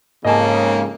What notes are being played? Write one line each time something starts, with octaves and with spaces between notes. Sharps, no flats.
F2 G#2 C#3 A#3 D#5 G#5 A5